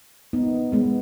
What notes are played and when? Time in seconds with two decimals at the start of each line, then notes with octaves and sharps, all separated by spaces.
0.33 B3 D#4
0.72 G#3 B3